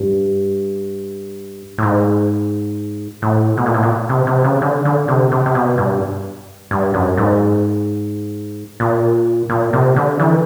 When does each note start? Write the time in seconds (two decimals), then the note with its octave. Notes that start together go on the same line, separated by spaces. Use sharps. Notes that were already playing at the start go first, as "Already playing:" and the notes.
Already playing: G2
1.78 A2
1.83 G#2
3.22 A2
3.57 B2
3.66 A#2
3.74 A2
3.83 A#2
4.09 C3
4.27 C3
4.44 C#3
4.62 D3
4.85 D3
5.08 C3
5.32 C3
5.46 C3
5.55 B2
5.78 G2
6.71 G2
6.94 F#2
7.17 G#2
8.80 A#2
9.49 A#2
9.73 C3
9.96 D3
10.20 E3